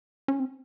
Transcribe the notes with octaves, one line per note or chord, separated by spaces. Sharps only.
C#4
C4